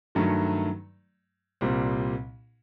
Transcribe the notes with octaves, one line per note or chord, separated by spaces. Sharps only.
G2 D#3 F#3 A3
C2 A#2 G3 C4